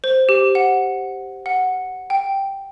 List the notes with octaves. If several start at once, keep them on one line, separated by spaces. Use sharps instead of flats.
C5
G4
F#5
F#5
G5